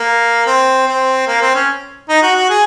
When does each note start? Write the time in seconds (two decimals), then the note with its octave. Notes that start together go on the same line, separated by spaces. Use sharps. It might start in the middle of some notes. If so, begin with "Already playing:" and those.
Already playing: A#3
0.46 C4
0.87 C4
1.27 A#3
1.41 C4
1.55 C#4
2.09 D#4
2.22 F#4
2.35 F#4
2.50 G#4